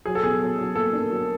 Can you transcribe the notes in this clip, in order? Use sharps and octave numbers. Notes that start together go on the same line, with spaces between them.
F#3 G#4
A4
B2 G#4
F#3
F#3
A#3 A4
D4
F#3